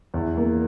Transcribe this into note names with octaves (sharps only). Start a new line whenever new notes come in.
E2
A#3